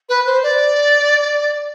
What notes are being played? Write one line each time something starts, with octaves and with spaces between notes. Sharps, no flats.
B4
C5
D5